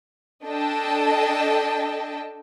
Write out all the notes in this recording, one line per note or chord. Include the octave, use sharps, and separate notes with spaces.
D4 A4 D#5 G5 A5